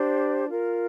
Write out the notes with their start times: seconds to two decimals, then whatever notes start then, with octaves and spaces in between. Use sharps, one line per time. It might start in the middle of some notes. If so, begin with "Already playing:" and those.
Already playing: D4 G4 C5
0.49 F4 A#4